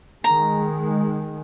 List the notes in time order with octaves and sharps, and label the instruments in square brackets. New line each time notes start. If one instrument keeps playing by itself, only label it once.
[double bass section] D#3 G#3 [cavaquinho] A#5